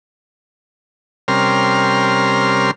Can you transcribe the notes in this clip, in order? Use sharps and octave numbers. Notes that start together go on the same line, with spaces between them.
C3 G3 C#4 A#4 C6 F6